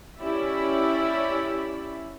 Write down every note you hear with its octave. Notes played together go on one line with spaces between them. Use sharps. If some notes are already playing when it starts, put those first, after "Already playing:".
C#4 E4 G4 D5 E5 B5